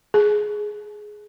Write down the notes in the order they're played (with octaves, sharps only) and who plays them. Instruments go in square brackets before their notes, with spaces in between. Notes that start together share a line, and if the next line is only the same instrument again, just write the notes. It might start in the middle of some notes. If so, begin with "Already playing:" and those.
[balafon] G#4